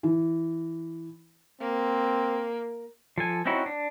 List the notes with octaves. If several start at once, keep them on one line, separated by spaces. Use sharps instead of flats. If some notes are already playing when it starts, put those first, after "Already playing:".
E3
A#3 C4
F3 A4 G#5
C4 C#4 D#4 E4 F#4
D4